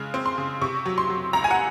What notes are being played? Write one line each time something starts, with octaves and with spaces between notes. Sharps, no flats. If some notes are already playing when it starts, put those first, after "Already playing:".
Already playing: C#3 G#3
C4
C6
C#3
C3 C#6
F#3
C6
F#3
C#2 A#5
G#5
F#5